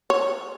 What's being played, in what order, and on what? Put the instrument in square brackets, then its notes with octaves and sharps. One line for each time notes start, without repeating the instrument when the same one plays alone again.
[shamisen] C#5